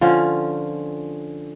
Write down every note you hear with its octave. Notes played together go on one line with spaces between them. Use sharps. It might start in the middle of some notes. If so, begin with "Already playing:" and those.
D3 F3 C#4 F4